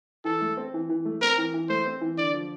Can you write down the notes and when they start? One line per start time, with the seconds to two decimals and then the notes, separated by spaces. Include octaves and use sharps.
0.25 E3 A4
0.41 A3
0.57 C4
0.74 E3
0.89 E3
1.05 A3
1.22 C4 A#4
1.38 E3
1.54 E3
1.69 A3 C5
1.86 C4
2.01 E3
2.18 D3 D5
2.33 F3